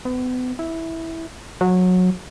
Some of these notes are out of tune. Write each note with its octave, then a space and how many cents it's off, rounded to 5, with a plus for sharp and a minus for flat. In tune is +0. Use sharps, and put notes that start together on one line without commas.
B3 +35
E4 -10
F#3 -20